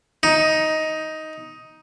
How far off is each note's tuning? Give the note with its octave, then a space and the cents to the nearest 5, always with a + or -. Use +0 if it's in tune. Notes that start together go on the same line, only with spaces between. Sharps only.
D#4 +10